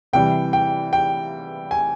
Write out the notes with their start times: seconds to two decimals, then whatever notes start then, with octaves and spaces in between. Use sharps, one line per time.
0.13 C3 E3 G3 G5
0.53 G5
0.93 G5
1.71 G#5